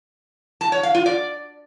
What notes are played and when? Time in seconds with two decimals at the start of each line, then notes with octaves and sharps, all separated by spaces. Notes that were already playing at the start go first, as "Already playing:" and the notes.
0.61 A5
0.72 C#5
0.83 F5
0.95 F4
1.06 D5